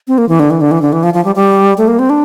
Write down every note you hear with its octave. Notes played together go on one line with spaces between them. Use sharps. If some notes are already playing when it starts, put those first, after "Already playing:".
C4
A#3
E3
D3
E3
D3
E3
D3
E3
F3
F3
G3
G3
A3
A#3
C4
D4